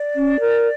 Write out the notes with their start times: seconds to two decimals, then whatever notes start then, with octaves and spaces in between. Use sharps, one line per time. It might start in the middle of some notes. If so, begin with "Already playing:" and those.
Already playing: D5
0.15 C#4
0.40 A#4